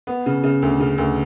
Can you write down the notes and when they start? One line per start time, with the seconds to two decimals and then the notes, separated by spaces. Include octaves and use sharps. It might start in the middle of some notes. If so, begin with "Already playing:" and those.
0.07 B3
0.26 C#3
0.44 C#3
0.62 D2
0.80 C#3
0.98 D2